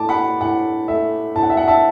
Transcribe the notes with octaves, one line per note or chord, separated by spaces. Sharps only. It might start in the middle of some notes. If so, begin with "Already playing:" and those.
Already playing: A2 A3 A5 D6
F#5 B5
A2 F#5
A3 E5
A2 A5
F#5
E5
F#5
E5 A5